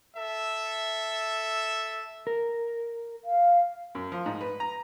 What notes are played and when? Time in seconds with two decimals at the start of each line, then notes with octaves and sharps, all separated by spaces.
0.16 A4 E5
2.27 A#4
3.25 F5
3.95 F#2
4.12 F3
4.26 G#2
4.41 B4
4.60 A#5